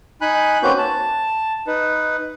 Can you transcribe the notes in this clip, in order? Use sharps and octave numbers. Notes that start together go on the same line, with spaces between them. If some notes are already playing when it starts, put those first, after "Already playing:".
D#4 G#5 B5 F#6
A#3 C4 C#4 F#4 B4 G6
A5
D#4 B4